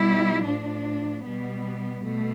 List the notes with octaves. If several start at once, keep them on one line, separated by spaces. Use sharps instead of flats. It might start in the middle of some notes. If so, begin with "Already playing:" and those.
Already playing: B2 G3 E4
A2 F3 D4
B2 G3 B3
B2 A3